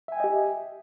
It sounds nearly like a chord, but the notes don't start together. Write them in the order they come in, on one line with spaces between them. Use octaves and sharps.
E5 G#5 G5 D#5 G4